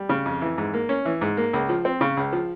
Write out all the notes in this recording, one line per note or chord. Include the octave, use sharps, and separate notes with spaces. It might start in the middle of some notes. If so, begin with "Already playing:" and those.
Already playing: G3
C#3
F2
E3
G#2
A#3
C#4
E3
G#2
A#3
C#2
F3
C4
C#3
C#2
F3